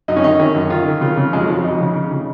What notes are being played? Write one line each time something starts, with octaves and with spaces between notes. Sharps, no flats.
F#2 D#4
C#4
D#3 D#4
D#3 C#4
F#2
D#3 F4
D#3
C#3 F4
C#3
F2 G#3
F#3
F2 F3
F#3
F2 D#4
C#3
C#3
C#3